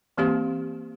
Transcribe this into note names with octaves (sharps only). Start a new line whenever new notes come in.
E3 A#3 C4 G4 F5 C6